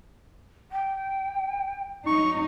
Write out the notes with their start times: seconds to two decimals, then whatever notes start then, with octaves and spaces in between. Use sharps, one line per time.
0.71 G5
2.07 F#3 D#4 C#6